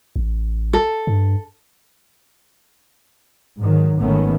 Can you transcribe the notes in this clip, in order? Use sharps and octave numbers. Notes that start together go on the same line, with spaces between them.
A1
A4
G2
G#2 D#3 F#3
G#1 D#3 A3 B3 C#4